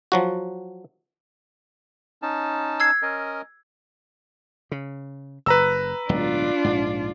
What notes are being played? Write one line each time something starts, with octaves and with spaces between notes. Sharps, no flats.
F3 F#3 F#4
C#4 D#4 A5
E6 G#6 C7
C#4 A#4 D#5
C#3
F#1 B4 A#5 E6
D1 B1 G#3 D4 F4
A#1 G#2